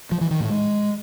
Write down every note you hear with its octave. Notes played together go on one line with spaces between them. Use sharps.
F3
E3
D#3
A2
G#3